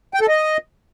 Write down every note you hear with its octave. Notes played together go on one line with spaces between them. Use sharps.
G5
A4
D#5